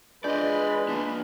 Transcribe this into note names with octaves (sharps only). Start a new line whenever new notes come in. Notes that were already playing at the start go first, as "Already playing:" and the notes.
G#3 D4 F4 B4 D5 D#5 G6
A#3 D4 B5